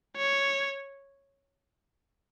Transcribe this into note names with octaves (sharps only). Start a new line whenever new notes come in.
C#5